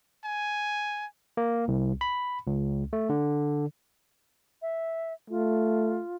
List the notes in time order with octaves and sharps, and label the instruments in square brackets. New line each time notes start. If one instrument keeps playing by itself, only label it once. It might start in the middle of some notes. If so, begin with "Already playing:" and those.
[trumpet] G#5
[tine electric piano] A#3
C2
B5
C#2
A3
D3
[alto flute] E5
[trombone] A3 [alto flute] F4